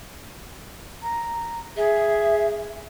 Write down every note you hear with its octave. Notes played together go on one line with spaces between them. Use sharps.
A#5
G#4 E5